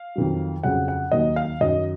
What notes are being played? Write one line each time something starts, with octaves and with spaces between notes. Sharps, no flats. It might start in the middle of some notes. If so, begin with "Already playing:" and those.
Already playing: F5
F2 D#3 F#3
F2 C#3 F#3 F#5
F#5
D#2 D#3 F#3 D#5
F5
F#2 D#3 F#3 D#5